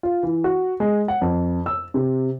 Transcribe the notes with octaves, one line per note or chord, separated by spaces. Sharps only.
F4
E3
F#4
G#3
F#5
F2
E6
C3